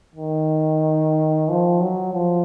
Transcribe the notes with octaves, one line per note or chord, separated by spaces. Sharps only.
D#3
F3
F#3
F3